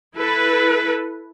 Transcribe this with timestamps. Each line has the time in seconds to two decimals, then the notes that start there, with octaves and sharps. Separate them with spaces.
0.15 E4 A4 B4